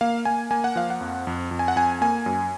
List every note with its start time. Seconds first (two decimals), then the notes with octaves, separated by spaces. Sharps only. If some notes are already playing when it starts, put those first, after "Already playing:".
0.01 A#3 F5
0.25 A#3 G#5
0.51 A#3 G#5
0.64 F#5
0.76 F3 F5
0.90 F#5
1.01 F2
1.27 F2
1.51 F2
1.59 G#5
1.68 F#5
1.76 F2 G#5
2.01 A#3 G#5
2.26 F#2